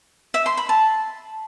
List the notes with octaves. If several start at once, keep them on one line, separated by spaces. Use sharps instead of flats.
E5
C6
B5
A5